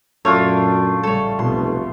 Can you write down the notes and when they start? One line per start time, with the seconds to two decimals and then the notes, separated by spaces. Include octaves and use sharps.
0.25 F#2 A#2 A3 D4 F4 C#5
1.03 A1 C#3 G3 A4 C#5
1.39 F1 B1 B2 C6